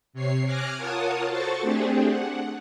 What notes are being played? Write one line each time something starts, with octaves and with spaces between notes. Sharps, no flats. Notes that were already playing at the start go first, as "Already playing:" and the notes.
C3 C#5 C7
G#5 D6 F6 F#6 G#6 A#6
F4 A#4 C#5 F#5 A5 D#6
F#4 A4 C5 C#6 A6
A3 C4 D4 G4 G#4
F#5